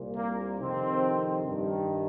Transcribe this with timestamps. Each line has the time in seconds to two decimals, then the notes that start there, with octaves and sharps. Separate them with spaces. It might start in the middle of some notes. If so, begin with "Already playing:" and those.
Already playing: C2 A#2
0.16 A#3
0.59 F2 C3 D#3 C4
1.45 G2 D#3